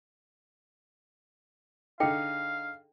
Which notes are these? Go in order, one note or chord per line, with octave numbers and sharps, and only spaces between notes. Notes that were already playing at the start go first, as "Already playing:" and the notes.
D3 D#4 G#4 A4 F5 G5